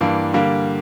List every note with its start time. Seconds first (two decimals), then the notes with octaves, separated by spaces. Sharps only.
0.01 G2 E3 A#3 D4
0.34 D3 G3 A#3